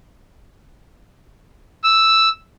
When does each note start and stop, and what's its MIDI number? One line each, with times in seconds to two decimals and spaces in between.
1.84 2.29 88